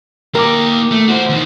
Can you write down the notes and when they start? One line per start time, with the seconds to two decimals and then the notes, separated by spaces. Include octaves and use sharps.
0.35 A#3 A#4 G5 D6
0.92 A3
1.09 F#4 C5
1.30 D#2 D#3